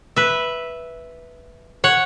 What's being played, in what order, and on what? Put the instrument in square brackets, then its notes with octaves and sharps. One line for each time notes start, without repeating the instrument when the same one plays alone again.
[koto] B4 E5
C#5 F#5